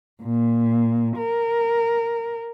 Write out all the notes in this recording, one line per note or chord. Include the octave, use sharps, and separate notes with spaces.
A#2
A#4